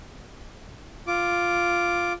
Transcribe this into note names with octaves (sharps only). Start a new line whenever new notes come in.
F4 D6